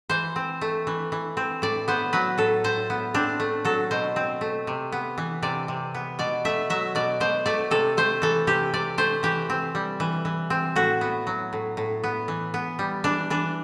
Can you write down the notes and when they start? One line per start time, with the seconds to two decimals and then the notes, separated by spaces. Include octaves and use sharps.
0.10 E3 C5
0.36 C4
0.61 A3
0.87 E3
1.12 E3
1.37 C4
1.62 A2 D5
1.88 B3 C5
2.13 F#3 B4
2.38 A2 A4
2.64 A2 C5
2.90 B3
3.14 C4 D4
3.40 A3
3.65 F#3 A4
3.91 B2 C5
4.16 C4
4.41 A3
4.67 C3
4.92 B3
5.18 E3
5.42 C3 D5
5.68 C3
5.95 B3
6.19 B2 D5
6.45 A3 E5
6.70 F#3 E5
6.95 B2 D5
7.20 B2 C5
7.46 A3 D5
7.71 C3 A4
7.97 A3 C5
8.22 E3 A4
8.47 C3 G4
8.73 C3 D5
8.98 A3 C5
9.23 E3 G4
9.50 C4
9.75 G3
10.00 E3
10.25 E3
10.50 C4
10.76 A2 F#4
11.01 B3
11.27 F#3
11.53 A2
11.77 A2
12.04 B3
12.28 E3
12.54 B3
12.79 G3
13.04 E3 D4
13.30 E3 D4